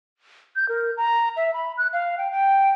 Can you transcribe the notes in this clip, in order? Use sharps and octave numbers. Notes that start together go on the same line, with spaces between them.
G6
A#4
A#5
E5
B5
F#6
F5
G5
G5